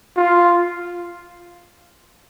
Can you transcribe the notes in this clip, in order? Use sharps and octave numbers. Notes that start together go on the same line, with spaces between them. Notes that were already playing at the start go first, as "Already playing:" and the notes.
F4